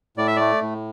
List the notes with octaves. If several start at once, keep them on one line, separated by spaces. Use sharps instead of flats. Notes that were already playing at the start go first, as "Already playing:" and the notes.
A2 D5
E5
A3 D5
A2